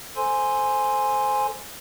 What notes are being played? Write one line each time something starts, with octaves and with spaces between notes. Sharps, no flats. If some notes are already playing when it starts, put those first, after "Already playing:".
A4 C5 G#5 C6